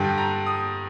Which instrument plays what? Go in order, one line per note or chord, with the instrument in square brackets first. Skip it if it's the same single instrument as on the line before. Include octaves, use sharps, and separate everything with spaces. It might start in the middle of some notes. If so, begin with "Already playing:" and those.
Already playing: [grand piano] G2 D3 G3 G5
A#5
D#6